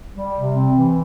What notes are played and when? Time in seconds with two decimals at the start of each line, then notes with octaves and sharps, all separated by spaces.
0.15 G3
0.35 C3
0.54 C4
0.74 E3